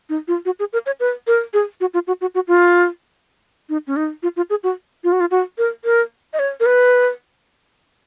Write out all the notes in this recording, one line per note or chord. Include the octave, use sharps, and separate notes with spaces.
D#4
F4
F#4
G#4
A#4
C#5
B4
A#4
G#4
F#4
F4
F#4
F#4
F#4
F4
D#4
C#4
D#4
F4
F4
G#4
F#4
F4
F#4
F4
F#4
A#4
A#4
D#5
C#5
A#4
B4